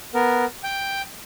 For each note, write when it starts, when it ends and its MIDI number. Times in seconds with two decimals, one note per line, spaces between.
0.14 0.45 59
0.14 0.45 70
0.64 1.02 79